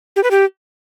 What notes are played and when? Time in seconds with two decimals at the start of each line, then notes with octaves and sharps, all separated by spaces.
0.16 G4
0.23 B4
0.31 G4